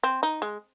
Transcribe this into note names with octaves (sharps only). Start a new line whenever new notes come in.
C4
D#4
G#3